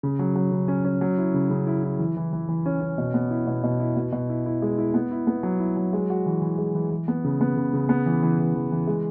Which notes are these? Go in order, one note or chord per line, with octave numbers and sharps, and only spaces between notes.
C#3
F#3
F#3
C#3
C#4
C#4
F#3
E4
C#3
C#3
E4
E4
E3
E3
E3
E3
C#4
C#4
B2
B3
E4
B2
B2
E4
B2
B2
E4
E4
G#3
E4
B3
E4
B3
F#3
E4
F#3
G#3
F#4
E3
E3
G#3
E3
E3
B3
C#3
B3
C#3
C#3
B3
E3
E3
E3
E3
E3
G#3